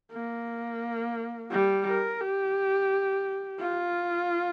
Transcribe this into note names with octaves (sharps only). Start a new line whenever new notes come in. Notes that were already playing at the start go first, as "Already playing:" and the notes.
A#3
G3
A#4
G4
F4